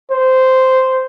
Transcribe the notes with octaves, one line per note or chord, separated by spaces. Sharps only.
C5